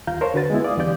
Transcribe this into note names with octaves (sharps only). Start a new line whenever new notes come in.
D#2 F4 F5 A#5 G6
A#4 C5 C#5 A5
D3 F#4 B4 A6
G#3 B3 E4
D5 F5 D6 D#6
E2 D3 E3 G4 D5 G6